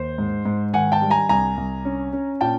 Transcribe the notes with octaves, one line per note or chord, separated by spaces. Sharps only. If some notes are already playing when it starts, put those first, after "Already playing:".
Already playing: D#2 C5
G#2
G#2
D#3 F#5 G#5
G5 A5
G3
G#5 A#5
C2 G#5 A#5
C2
C#4
C#4
A#2 G5 A5